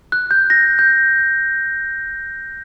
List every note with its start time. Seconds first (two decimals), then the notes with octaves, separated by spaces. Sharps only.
0.12 F#6
0.31 G6
0.50 A#6
0.79 G6